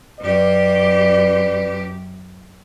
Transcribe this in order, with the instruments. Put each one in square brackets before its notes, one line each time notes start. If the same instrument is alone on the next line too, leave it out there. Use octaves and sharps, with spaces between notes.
[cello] F#2 G4 [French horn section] B4 D5